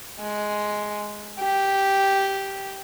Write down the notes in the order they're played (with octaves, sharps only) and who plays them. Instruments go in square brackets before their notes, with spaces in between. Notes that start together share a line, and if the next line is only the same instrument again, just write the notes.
[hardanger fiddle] G#3
G4